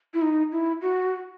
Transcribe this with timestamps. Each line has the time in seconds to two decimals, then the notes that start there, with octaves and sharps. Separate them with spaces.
0.14 E4
0.22 D#4
0.52 E4
0.81 F#4